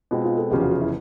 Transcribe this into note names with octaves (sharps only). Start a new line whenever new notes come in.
B2 G#3 C4 F4
F4
A4
F1 E2 C#3 F3 G4
F#4
F4
E4